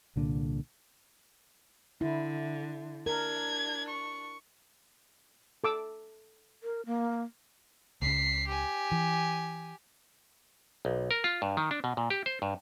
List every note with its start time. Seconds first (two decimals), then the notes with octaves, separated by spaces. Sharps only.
0.16 C2 A#2 D3
2.01 D3 E4
3.06 D4 A#4 G#6
3.89 C#6
5.64 A4 D6 E6
6.63 A#4
6.86 A#3
8.02 C#2 C#3 B6 C7
8.48 G4 G#5
8.92 E3
10.85 B1
11.11 A#4
11.24 F4
11.42 G2
11.57 D#3
11.71 D4
11.84 B2
11.97 A#2
12.10 G4
12.26 C5
12.42 G2